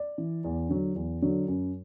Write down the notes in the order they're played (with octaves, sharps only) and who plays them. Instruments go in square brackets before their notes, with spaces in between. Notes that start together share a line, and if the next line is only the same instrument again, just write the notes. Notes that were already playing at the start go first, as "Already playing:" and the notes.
Already playing: [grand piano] D5
E3
E2
D3 F#3
E2
D3 F#3
F#2